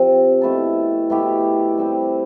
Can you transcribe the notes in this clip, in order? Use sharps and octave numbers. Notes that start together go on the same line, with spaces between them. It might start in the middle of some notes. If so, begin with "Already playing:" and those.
Already playing: C3 F3 C4
B2 A3 E4 A4
B2 A3 E4 G4
G3 C4 G4